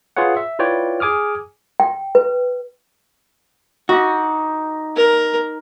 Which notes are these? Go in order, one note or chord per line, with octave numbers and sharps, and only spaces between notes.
F4 G#4 B4 C#5 F#5
E5
E4 F4 B4 C#5 D5 G5
G#4 G#5 D6 D#6 F6
G5
B4
D#4 F#4 D6
A#4